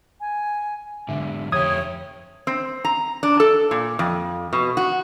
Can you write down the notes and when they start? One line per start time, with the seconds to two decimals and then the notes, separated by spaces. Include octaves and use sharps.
0.21 G#5
1.09 G#2 D3 E5
1.52 F2 G4 C#5 D#6 G#6
2.47 C4
2.85 A#5
3.23 D4
3.40 A4
3.71 A#2
3.99 F2
4.53 B2
4.77 F#4